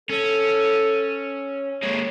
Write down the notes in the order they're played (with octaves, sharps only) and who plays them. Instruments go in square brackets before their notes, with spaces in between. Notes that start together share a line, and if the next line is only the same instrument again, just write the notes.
[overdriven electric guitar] C#4 [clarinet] A4
[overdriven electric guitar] G#3 A#3 [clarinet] C#5